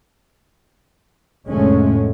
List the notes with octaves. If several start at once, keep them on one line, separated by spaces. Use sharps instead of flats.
F1 A2 D3 G#3 A3 C#4